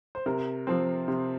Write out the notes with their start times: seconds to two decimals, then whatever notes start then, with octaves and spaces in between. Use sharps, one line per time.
0.15 C5
0.26 C3 A#4
0.67 F3 C4
1.08 C3